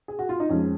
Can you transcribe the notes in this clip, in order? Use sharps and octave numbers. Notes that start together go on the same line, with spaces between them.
G#4
F#4
F4
D#4
F2 F3 G#3 C#4